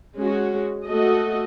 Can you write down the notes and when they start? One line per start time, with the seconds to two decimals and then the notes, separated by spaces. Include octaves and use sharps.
0.17 G#3 C#4 F#4
0.86 A3 F#4 A4 D#5